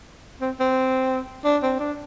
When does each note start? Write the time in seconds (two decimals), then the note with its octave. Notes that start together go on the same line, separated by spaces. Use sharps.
0.41 C4
0.60 C4
1.45 D4
1.63 C4
1.80 D4